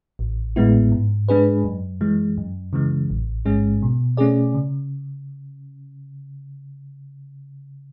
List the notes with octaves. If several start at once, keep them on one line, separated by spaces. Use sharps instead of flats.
A1
A2 G#3 B3 E4
G#2
G#3 D4 G#4 B4
F#2
E3 G#3
F#2
C#3 E3 G#3
A1
G#2 G#3 C#4 G#4
B2
A3 C#4 G#4 D5
C#3